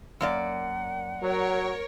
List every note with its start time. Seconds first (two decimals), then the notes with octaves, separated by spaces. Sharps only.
0.21 F#2 A#3 D5 F#5
1.22 F#3 A#4 C#5